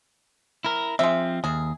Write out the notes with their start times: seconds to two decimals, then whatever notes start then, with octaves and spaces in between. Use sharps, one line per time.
0.64 E4 A#4
0.99 F3 G#3 C4 E5
1.44 D#2 G#4